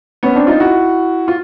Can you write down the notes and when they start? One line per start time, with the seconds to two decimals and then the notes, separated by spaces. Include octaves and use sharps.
0.23 B3 C#4
0.35 C4 D4
0.47 D#4 F4
0.60 E4 F#4
1.28 F4